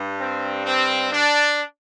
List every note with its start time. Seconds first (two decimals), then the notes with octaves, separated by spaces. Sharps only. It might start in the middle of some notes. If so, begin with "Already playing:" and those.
Already playing: G2 G3
0.19 C4
0.66 C4
1.12 D4